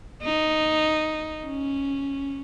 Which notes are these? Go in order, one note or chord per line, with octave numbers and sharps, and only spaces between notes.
D#4
C#4